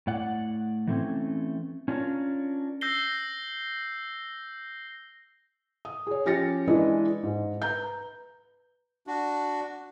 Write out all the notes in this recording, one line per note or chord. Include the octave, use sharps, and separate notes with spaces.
A2 D5 F#5
E3 A3 C4 C#4
C#4 D4 F4 G4 A#4 C#5
E6 G6 A#6 C7 G7
D#6
G#4 C#5
F3 C#4 G4 A6 A#6 C#7
E3 G#3 D4 B4 D#5 G#5
G#2
B4 A#5 G6
D4 F#4